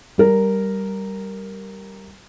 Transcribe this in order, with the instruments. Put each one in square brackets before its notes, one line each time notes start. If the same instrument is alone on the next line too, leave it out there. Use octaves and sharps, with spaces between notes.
[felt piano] G3 A#4